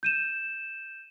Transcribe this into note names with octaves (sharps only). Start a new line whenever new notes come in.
G6 D#7 E7